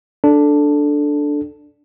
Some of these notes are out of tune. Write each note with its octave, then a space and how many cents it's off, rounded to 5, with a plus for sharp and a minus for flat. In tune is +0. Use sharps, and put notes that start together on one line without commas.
D4 +0 A4 +0